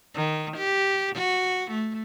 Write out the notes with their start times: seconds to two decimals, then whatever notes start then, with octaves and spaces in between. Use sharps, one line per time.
0.15 D#3
0.57 G4
1.16 F#4
1.72 A3